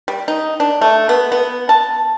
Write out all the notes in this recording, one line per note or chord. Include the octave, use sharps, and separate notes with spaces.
G3
D#4
D4
A3
B3
B3
A5